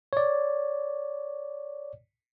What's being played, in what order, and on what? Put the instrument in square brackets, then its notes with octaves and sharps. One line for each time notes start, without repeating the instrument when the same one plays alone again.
[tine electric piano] C#5 D5